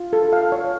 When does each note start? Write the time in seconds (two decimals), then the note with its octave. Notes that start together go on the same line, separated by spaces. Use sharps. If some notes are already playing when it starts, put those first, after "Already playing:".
Already playing: F4
0.13 A4
0.33 F5
0.52 C#5